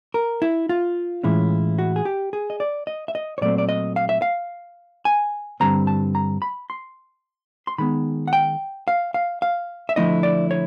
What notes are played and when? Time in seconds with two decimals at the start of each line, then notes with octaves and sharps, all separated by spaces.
0.14 A#4
0.42 E4
0.69 F4
1.23 A2 E3 G#3 C#4 E4
1.79 F#4
1.96 G#4
2.05 G4
2.33 G#4
2.50 D#5
2.60 D5
2.87 D#5
3.08 E5
3.15 D#5
3.38 C#5
3.41 A#2 F#3 A3 C4 D5
3.58 D5
3.69 D#5
3.96 F5
4.09 E5
4.22 F5
5.05 G#5
5.60 G2 D3 G3 C4 A#5
5.87 A5
6.15 A#5
6.42 B5
6.70 C6
7.67 C6
7.78 D#3 G#3 B3 B5
8.28 F#5
8.33 G5
8.88 F5
9.14 F5
9.42 F5
9.89 E5
9.96 D3 F3 A3 C#4 E4 D#5
10.23 D5
10.51 C#5